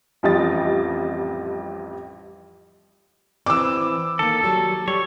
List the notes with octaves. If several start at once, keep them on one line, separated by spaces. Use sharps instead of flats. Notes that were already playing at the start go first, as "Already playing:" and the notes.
A1 F2 G3 D#5 A6
E3 C4 D6 E6
D#3 A#3 A4
F#3 G3
G3 C#5